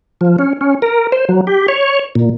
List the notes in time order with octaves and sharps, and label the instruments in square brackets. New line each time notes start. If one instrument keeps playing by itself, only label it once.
[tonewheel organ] F3
C#4
C#4
A#4
C5
F#3
G4
C#5
A#2